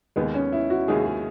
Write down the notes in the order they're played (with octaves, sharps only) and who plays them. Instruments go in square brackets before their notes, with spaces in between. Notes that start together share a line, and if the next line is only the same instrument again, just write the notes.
[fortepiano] D#2 D#3 G#3 [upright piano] B3
[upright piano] C#4
E4
F#4
[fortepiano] D#2 D#3 G#3 [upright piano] G#4
[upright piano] G#4